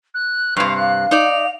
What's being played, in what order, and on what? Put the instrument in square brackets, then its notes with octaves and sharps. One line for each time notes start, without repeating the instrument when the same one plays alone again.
[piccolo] F#6
[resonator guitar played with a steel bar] G2 C3 [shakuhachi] B4 [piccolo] F5
[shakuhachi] F5 [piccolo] F#6
[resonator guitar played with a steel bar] D#4 D5 [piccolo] F7